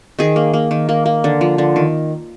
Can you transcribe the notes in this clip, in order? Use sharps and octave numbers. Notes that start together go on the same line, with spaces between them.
D#3 G#4
A#3
A#3
D#3
A#3
A#3
D3
F3
D3
D#3